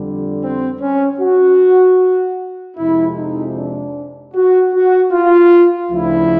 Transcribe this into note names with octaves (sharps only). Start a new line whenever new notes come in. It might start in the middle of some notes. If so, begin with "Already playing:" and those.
Already playing: F2 D3 G3
C4
C#4
F#4
F2 C3 F3 G#3 E4
D#4
D4
F#4
F#4
F4
D2 C#3 F3 E4